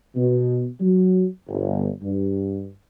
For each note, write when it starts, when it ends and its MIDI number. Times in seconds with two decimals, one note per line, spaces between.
0.15 0.66 47
0.80 1.25 54
1.47 1.87 31
2.02 2.68 43